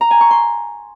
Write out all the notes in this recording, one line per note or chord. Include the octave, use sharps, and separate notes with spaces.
A#5
G#5
C#6
C6